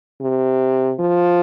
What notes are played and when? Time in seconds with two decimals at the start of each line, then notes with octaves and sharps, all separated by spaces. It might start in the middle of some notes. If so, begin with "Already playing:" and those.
0.21 C3
0.99 F3